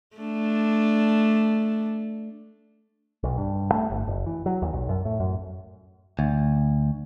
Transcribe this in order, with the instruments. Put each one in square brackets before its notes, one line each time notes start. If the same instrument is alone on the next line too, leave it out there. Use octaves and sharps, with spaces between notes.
[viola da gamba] A3 D4
[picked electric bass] B1
G2
A3
G1
F#1
E3
F#3
D#2
B1
F#2
A2
F#2
[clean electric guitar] D2